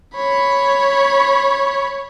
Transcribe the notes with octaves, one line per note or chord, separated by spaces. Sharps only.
C#5 B5